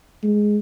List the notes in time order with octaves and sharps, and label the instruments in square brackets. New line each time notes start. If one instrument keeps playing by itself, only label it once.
[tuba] G#3